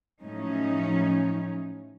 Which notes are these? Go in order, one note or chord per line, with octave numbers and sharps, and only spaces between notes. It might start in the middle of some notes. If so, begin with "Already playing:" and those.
A2 F3 F#3 C#4 D#4